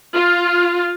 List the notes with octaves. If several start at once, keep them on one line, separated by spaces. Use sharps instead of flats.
F4